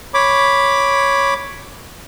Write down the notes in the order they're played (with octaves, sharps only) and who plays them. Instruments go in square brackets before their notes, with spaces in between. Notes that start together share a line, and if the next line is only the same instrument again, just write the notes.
[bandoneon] C#5 B5 D6